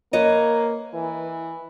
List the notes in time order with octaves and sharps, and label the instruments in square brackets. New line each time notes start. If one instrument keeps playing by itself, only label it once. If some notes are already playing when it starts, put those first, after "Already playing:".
[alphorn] A#3 [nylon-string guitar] B4 C#5 D#5
[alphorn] E3